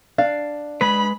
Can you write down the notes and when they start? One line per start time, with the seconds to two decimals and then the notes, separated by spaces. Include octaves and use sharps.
0.18 D4 F5
0.81 G#3 B4 B5